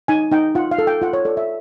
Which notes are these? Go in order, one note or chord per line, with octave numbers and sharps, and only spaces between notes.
D#4 G#5
D#4 G5
F4 F#5
F5
A4
G5
F4 F#5
C#5
A4 D5
E5